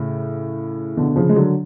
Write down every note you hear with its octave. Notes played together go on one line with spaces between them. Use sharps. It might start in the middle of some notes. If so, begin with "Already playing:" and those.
Already playing: A2 C#3
B2 D3
C#3 F3
G#3
D3 F#3